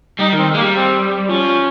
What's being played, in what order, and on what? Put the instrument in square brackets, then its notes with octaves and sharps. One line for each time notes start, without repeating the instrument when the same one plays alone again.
[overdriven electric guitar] G3 [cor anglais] D#4
[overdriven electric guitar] D#3 [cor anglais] C4
[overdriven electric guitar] G#3 [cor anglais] A#3
[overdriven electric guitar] G3
[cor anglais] C4
[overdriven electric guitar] F3 [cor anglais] C#4